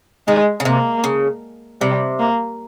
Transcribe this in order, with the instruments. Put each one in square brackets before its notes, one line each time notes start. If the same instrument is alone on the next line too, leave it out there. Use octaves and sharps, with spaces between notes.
[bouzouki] D#3 [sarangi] G#3
[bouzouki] C#3
[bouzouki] C3 [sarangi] A#3
[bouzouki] C#3
[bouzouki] C3 [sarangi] G3
[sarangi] A#3